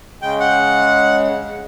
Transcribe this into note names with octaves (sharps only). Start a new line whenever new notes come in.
C#3 G#3 G5
F#5